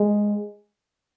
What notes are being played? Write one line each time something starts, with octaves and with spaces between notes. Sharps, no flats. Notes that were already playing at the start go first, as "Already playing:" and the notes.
Already playing: G#3